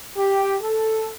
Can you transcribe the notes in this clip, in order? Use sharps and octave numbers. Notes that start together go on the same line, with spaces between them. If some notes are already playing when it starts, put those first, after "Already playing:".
G4
A4